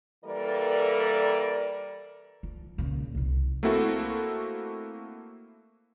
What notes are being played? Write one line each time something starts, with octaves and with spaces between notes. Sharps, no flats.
E3 G3 A#3 A4 A#4 D5
F3
A#2 C#3
C2 F3
A3 A#3 C4 E4 F#4 A4